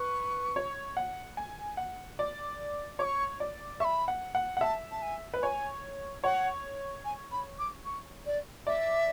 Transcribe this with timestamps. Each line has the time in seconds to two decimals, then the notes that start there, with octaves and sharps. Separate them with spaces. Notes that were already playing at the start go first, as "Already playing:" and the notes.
Already playing: B4 C#6
0.56 C#5
0.97 F#5
1.37 G#5
1.77 F#5
2.19 D5
2.99 C#5 D6
3.04 C#6
3.40 D5
3.80 E5 C#6
3.85 B5
4.08 F#5
4.35 F#5
4.57 F#5
4.61 E5 A5
4.92 A5
5.02 G#5
5.34 B4
5.42 C#5 G#5
6.24 C#5 F#5
7.05 G#5
7.32 B5
7.59 D6
7.85 C#6
8.26 D5
8.67 D5 E5